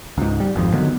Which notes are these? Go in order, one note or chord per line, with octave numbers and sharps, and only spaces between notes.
C#2 G#2
G3
G#1 F2 F3
D3 D#3 F#3 B3